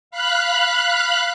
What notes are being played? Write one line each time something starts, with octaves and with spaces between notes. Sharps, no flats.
F5 B5 F#6